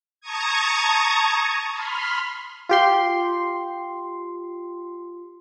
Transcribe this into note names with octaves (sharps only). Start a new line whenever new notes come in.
A5 A#5 C#6 D#6 G#6
B5 C6 F6
F4 G4 C6